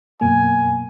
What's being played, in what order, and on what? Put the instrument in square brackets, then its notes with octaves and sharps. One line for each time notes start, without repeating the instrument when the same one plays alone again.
[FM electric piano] F#2 B2 A#3 [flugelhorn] G#5